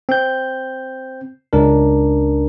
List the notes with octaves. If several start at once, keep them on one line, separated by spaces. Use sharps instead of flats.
C4 G6
C#2 D4 A#4